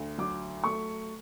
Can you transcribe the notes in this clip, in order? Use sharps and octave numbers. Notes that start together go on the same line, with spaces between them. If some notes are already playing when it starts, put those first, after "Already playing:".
Already playing: D2
F#3 D6
A3 C#6